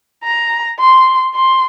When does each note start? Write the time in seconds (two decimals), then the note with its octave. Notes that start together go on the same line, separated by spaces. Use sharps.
0.24 A#5
0.79 C6
1.35 C6